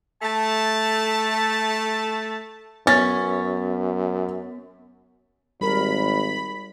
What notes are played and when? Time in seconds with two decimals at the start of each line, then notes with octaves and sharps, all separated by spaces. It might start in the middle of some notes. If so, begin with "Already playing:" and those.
0.22 A3 A5
2.87 F#2 B3 C#4 A6
5.61 G#1 G3 A#4 B5